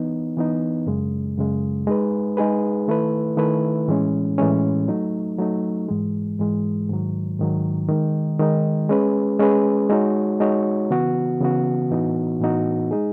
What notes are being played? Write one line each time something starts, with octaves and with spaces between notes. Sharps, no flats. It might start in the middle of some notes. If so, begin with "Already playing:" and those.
Already playing: E3 B3 D#4
E3 B3 D#4
F#2 C#3 G#3
F#2 C#3 G#3
G#3 D#4 G#4 B4
G#3 D#4 G#4 B4
D#3 A3 E4 B4
D#3 A3 E4 B4
A2 E3 G#3 C#4
A2 E3 G#3 C#4
F#3 A3 D#4
F#3 A3 D#4
G#2 E3 G#3
G#2 E3 G#3
G#2 D#3 F#3
G#2 D#3 F#3
D#3 G#3 D#4
D#3 G#3 D#4
G#3 C#4 G#4 B4
G#3 C#4 G#4 B4
G#3 D#4 F#4 C#5
G#3 D#4 F#4 C#5
C#3 E3 B3 F#4
C#3 E3 B3 F#4
A2 E3 B3 D#4 F#4
A2 E3 B3 D#4 F#4
G#3 D#4 G#4